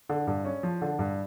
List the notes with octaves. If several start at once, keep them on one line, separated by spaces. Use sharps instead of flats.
D3
G2
C#4
F3
D3
G2